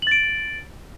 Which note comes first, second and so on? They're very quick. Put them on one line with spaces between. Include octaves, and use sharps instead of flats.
F#7 A6 D7